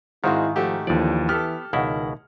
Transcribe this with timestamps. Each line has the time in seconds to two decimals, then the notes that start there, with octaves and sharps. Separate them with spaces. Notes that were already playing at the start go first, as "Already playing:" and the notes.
0.24 G#2 D#3 G#3 C4 E4 F#4 F5
0.56 F3 A3 F#4 G4
0.87 D#2 D3 E3 F3 D5
1.29 E3 B3 G4 A4 F6
1.73 C#2 B2 D#3 E4 F#5